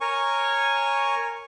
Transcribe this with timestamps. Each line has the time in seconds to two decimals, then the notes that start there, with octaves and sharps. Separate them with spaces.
0.01 A#4 C#5 G#5 C#6